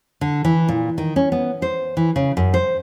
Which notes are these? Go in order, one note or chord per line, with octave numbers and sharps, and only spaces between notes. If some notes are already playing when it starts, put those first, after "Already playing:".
D3
E3
A#2
D#3
C#4
B3
C5
E3
C#3
F#2
C5